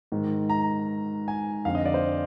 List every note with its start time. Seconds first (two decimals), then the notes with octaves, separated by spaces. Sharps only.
0.12 G#2 D#3
0.49 A#5
1.28 G#5
1.65 F2 D3 F5
1.75 D#5
1.85 D5
1.94 C5